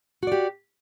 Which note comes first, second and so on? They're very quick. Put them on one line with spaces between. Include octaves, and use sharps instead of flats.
F#4 D5 G4